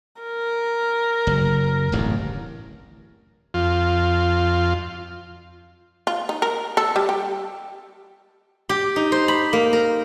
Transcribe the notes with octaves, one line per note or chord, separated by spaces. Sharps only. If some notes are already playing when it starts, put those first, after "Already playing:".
A#4
F#1
D1 A1 G2
F2 F4
F4
D#4
A#4
A4
G3
G4
G4
D#4
C5
B5
A#3
A#4